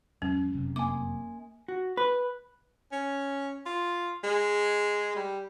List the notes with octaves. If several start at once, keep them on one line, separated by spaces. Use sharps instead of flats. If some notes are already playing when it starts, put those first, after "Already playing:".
E2 F#3 G#3 C#4
F1 F#2 C3
A#3 G#5 D6
F#4
B4
C#4
F4
G#3
G3